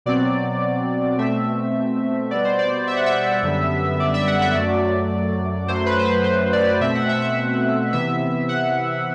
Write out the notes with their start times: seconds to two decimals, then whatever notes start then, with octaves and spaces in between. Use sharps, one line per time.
0.06 B2 F#3 C4 D5
1.18 B2 A3 C4 E5
2.30 B2 G3 B3 D5
2.45 C5
2.59 D5
2.87 E5
2.96 F#5
3.06 E5
3.43 F#2 D3 G3 B3
4.00 D5
4.14 E5
4.27 F#5
4.42 E5
4.55 F#2 F#3 A3 D5
5.68 F#2 F#3 A3 C5
5.86 B4
5.99 C5
6.06 B4
6.24 C5
6.53 D5
6.80 B2 A3 C4 E5
6.95 F#5
7.09 E5
7.22 E5
7.93 C3 E3 B3 E5
8.49 F#5